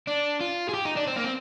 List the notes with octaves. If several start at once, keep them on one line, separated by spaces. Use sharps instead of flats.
D4
F4
G#4
G4
D#4
D4
C4
A#3
C4